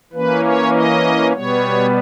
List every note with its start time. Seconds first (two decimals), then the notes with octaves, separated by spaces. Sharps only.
0.13 E3 A#3 C#4 B4
0.43 C#5
0.73 D#5
1.33 B2 G3 B3 C#5